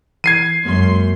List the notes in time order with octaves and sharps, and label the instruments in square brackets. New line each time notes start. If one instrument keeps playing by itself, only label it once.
[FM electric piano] E3 [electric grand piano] G#6 C7 D#7
[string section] F#2 C6 [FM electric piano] G#3 A#3